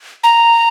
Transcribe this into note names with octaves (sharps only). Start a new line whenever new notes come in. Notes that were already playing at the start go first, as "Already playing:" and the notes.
A#5